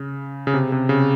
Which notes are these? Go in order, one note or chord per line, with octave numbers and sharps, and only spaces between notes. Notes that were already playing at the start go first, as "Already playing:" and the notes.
Already playing: C#3
C#3
C3
C3
C#3